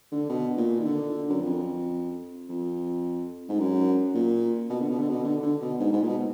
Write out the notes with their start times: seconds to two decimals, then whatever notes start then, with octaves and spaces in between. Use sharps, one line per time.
0.12 D3
0.30 B2
0.58 A#2
0.80 D#3
0.85 D3
1.30 F#2
1.40 F2
2.49 F2
3.49 G#2
3.60 F#2
4.14 A#2
4.70 B2
4.80 D3
4.89 B2
4.99 D3
5.10 B2
5.24 D3
5.43 D3
5.61 B2
5.79 G#2
5.93 G#2
6.02 A#2
6.07 B2